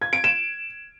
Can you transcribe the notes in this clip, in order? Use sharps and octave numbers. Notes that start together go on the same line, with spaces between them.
G#6
D7
E7